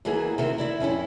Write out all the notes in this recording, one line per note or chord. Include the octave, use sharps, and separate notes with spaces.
D#2 E3 A#3 F#4 G#4
C3 D#3 C4
E4 D5 E5
F2 C4 C#4 E4